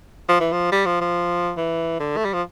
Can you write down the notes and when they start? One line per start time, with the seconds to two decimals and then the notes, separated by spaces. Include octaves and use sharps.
0.29 F3
0.40 E3
0.52 F3
0.72 G3
0.86 F3
1.00 F3
1.57 E3
2.00 D3
2.17 A3
2.25 G3
2.33 F3